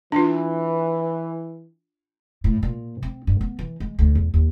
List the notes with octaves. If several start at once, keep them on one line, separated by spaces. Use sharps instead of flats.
E3 D4 F4
A2
A#2
C4
G2
B3
E3
G#3
D2
E2
D#2